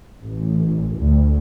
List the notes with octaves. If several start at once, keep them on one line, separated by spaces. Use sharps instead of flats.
A1
D2